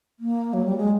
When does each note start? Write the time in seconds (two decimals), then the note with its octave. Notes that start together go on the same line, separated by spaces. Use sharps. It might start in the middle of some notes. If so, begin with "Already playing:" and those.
0.20 A#3
0.53 F#3
0.65 G3
0.77 G#3